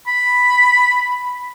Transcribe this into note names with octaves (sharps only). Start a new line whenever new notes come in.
B5